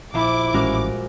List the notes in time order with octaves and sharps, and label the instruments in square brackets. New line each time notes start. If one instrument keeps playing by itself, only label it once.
[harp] A#1 [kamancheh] E4 [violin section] D6
[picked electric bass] A1 C#4 [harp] G#3 F#4 A#4